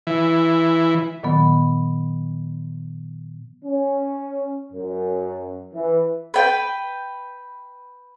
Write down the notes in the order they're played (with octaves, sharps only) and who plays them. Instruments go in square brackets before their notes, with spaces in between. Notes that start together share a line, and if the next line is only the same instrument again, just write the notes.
[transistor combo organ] E3
[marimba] A#2 D#3 F#3 B3
[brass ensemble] C#4
F#2
E3
[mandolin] B4 G5